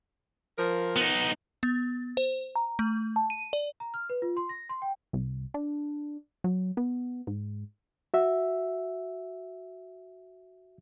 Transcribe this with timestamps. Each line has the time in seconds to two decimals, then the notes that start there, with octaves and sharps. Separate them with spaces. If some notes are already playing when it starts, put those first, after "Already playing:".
0.58 F3 A#4
0.96 B3 D#4
1.63 B3
2.17 C5
2.56 A#5
2.79 A3
3.16 A5
3.30 D#7
3.53 D5
3.80 A#5
3.94 F6
4.10 B4
4.22 F4
4.37 C6
4.49 A#6
4.69 C6
4.82 G5
5.13 C2
5.54 D4
6.44 F#3
6.77 B3
7.27 G#2
8.14 F#4 E5